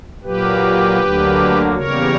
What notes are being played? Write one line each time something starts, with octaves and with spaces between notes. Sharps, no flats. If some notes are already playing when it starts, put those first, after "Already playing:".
A#2 F#3 A#3 G4 B4
D2 D3 F#3 A#3
E2 C#3 G3 A#3 A#4 C#5